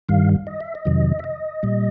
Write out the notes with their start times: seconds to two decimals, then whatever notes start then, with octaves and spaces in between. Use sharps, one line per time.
0.09 G2 D#3 G3 F5
0.47 D#5
0.60 E5
0.75 D#5
0.85 F2 C3 D#3 F#3
1.19 E5
1.24 D#5
1.63 A#2 G3